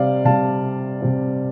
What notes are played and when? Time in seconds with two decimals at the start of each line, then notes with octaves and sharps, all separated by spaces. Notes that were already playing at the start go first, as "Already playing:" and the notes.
Already playing: C3 G3 C4 D5 F5
0.25 C3 G3 C4 F5 A5
1.01 C3 G3 C4